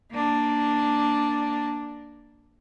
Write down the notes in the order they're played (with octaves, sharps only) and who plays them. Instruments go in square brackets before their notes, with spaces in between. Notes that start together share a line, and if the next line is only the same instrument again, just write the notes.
[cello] A#3 D4